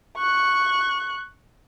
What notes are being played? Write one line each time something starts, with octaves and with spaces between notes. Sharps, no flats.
C#6 F#6